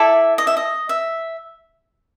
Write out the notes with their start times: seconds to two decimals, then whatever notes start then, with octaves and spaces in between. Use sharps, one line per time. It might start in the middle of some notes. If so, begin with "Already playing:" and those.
Already playing: E4 A4 D5 E5
0.38 D#5
0.47 E5
0.57 D#5
0.89 E5